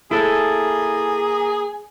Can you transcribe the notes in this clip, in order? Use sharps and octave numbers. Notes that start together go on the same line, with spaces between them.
A#3 E4 G#4 A4